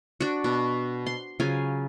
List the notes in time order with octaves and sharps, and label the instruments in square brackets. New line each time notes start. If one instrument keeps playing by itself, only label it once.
[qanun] D4 F#4
B2
C6
C#3 F#3 F4 G#5